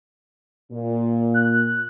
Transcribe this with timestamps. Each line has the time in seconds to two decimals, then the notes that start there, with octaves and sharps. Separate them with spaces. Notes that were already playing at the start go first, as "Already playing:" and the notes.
0.72 A#2
1.34 F#6